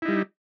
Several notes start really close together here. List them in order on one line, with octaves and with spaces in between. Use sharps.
E4 D#4 G3